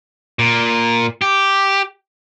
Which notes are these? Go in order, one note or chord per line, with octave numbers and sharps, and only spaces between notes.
A#2
G4